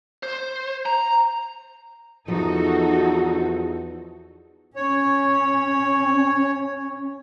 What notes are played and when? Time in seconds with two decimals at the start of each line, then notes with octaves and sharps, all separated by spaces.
0.23 C5
0.86 A#5
2.28 E2 F3 D#4 F#4 A4
4.76 C#4 C#5